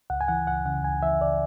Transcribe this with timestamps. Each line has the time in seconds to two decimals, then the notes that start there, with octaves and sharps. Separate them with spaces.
0.10 C#2 F#5
0.21 G#5
0.28 E3 F#5
0.47 C#2 F#5
0.65 C#3 F#5
0.84 C#2 G#5
1.03 E3 E5
1.21 C#2 D5